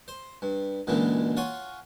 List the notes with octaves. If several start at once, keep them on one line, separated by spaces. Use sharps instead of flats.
C5
G2
C#2 F#2 A#2 D3 E3 G#3
F4 C#5 F#5 G#5